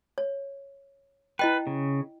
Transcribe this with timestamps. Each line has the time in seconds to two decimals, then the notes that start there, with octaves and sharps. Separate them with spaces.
0.18 C#5
1.39 E4 B4 D#5 G5
1.67 C#3